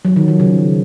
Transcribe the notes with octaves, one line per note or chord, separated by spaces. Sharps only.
F#3
D#3
F3
C#3